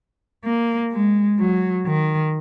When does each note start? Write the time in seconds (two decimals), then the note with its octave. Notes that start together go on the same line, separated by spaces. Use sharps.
0.45 A#3
0.93 G#3
1.39 F#3
1.86 D#3